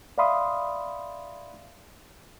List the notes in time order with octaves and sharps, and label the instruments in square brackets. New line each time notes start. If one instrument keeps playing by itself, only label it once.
[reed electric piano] D5 E5 F5 B5 C6 D#6